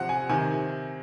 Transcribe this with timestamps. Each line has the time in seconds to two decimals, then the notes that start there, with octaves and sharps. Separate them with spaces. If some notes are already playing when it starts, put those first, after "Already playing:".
Already playing: C3 F3 F#5
0.09 G#5
0.29 C3 D#3 G#5